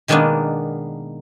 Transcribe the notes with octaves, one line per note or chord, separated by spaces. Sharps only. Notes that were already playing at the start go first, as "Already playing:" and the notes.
B2 D#3 G#3 A#3 B3 D4